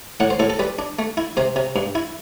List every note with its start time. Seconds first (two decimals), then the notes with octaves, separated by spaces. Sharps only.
0.20 A2 F#5
0.30 C5
0.40 A2 A4
0.50 A4
0.59 G3 B4
0.79 D4
0.99 A3
1.17 E4
1.37 C3 C5
1.56 C3
1.76 G2
1.95 E4